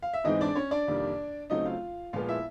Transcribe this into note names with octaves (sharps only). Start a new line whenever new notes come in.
F5
E5
G#2 E3 G#3 C4 D#4 D#5
D4 D5
C#4 C#5
D4 D5
F2 C3 D#3 G3 A#3
C#3 F#3 A3 C4 D#4 D#5
F4 F5
A#2 F3 G#3 B3 F4 F5
E4 E5